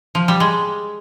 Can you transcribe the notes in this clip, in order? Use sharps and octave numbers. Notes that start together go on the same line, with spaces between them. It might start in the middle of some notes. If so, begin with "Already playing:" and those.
F3
G3
G#3